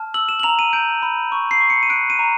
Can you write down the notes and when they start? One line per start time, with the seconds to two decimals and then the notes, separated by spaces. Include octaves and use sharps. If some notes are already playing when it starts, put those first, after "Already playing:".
Already playing: A5 F6
0.14 E6 F#7
0.29 E7
0.40 F#7
0.43 A#5 F7
0.59 D#7
0.73 G6 D7
1.02 B5
1.32 C#6
1.51 C7
1.60 C#6
1.70 C#7
1.83 D#7
1.90 F#6 D7
2.10 D#7
2.19 A#5